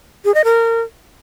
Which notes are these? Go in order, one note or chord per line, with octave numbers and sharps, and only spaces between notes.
G#4
D#5
A#4